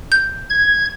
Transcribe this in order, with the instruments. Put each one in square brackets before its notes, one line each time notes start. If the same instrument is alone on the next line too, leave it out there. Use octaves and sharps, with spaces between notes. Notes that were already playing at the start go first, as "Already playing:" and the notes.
[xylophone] G6
[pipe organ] G#6